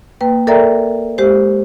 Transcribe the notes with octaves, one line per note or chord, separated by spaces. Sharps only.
A#3 B4 G5
A4 A#4 D5 E5 G5 A#5
G#3 G4 C5